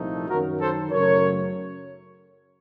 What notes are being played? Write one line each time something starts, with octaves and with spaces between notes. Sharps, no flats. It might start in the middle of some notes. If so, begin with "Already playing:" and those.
Already playing: C2 A#2 F3 A3 D#4
F#2 D#3 F#3 F#4 A#4
A4 C5
F#2 C#3 F#3 A3 A#4 C#5